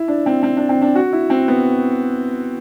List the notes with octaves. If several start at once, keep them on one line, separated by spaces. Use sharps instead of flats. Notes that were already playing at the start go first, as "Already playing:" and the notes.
Already playing: E4
D4
C4
C4
D4
C4
D4
F#4
E4
C4
B3